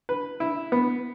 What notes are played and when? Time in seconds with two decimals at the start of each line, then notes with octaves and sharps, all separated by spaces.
0.09 B4
0.40 E4
0.72 B3